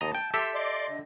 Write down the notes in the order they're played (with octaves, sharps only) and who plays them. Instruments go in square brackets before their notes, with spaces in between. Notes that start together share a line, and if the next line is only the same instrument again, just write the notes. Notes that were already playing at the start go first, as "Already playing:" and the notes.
[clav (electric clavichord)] D#2 D#5 A#5 [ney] A5
[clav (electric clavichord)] G5
[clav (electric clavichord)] G4 A4 E5 [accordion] C6 E6
[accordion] D5 C6 D6 [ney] D#5
[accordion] D3